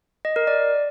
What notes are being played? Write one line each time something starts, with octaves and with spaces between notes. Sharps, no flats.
D#5
A#4
D5